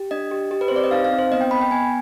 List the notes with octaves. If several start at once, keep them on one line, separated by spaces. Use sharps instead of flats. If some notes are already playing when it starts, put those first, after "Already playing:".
Already playing: G4
D4 D#5
G4
G4
B4
C5
C4 D5
D#5
D#4 F5
F5
C4
C5
B3 D#5
G5
B3 B5
G5
B3 G#5